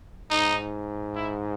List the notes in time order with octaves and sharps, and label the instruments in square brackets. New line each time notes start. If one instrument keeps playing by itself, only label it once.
[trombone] G#2 [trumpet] D#4
[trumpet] E4